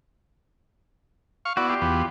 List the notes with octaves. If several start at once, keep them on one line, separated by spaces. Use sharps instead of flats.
F5 C#6
B3 E4 F#4 D5
F4 G4
E2 B3